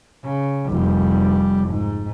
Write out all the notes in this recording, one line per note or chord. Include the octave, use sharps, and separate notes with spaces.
C#3
F1 G3
G#2